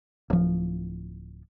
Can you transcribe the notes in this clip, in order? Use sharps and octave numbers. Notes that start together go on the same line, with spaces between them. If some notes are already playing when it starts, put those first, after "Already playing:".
D1 F3